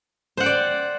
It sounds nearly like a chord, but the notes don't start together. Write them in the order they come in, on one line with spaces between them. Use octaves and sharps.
C5 F#5 G5 D5